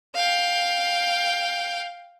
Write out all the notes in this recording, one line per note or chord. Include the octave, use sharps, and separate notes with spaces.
F5 G5